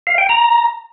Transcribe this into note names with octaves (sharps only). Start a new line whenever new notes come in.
F5
G5
A#5